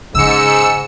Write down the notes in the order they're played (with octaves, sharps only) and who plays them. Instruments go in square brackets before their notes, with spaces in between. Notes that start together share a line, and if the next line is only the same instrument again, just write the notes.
[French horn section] G#2 [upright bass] C#3 [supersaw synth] E6 C#7